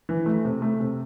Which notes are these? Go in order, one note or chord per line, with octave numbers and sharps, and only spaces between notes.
E3
A3
C3
A3
C3